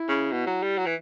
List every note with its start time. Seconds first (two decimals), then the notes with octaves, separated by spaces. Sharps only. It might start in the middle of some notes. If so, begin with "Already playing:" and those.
Already playing: E4
0.08 C#3
0.32 B2
0.47 F#3
0.62 G3
0.78 F#3
0.86 E3